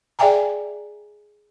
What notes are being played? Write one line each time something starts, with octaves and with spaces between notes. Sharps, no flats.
G#4 D5 E5 G5 G#5 A#5